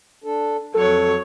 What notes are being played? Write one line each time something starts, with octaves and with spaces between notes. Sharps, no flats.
D4 A4
F2 F#3 A4 C#5